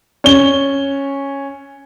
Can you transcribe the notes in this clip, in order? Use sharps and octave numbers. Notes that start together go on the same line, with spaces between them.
C#4 G7